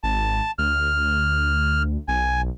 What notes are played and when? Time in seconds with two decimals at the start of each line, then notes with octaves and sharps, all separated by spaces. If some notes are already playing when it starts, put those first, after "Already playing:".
0.03 G#1 A5
0.59 D2 F6
2.08 B1 G#5